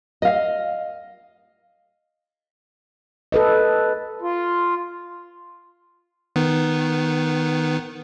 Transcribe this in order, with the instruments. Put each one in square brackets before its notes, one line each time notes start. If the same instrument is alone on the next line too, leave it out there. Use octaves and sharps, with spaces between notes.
[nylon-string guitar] D#5 F5
[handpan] A4 B4 D#5
[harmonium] F4
[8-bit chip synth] D#3 B3